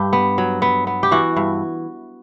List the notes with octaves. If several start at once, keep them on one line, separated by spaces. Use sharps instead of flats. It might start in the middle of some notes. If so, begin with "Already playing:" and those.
Already playing: G2 G4
B3
F#3
B3
B3
G4
E3 F#4
G2